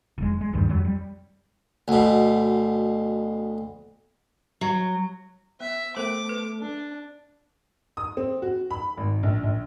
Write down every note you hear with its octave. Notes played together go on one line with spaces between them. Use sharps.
F1 G#3
G#3
D2 G2 D#3 G3
F2 F#3 G3
G3
D2 B2
F#3
B3 E5
A3 B3 A#4 C5 D6
B4
D4
D#6
C4
F#4
B5
G#1
A#1
A#1